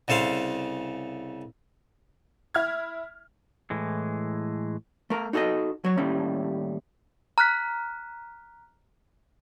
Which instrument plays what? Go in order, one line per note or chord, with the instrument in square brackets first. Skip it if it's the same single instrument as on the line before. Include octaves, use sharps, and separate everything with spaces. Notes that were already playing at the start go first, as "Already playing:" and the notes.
[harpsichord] C2 C#3 A4 C5 F5
[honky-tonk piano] E4 F6 G#6
[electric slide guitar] A2 E3 G#3
[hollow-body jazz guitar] A3 A#4
D#4 F#4 A4 D5 D#5
F#3 C#5
D#2 A2 G3 C#4
[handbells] A#5 F6 F#6 B6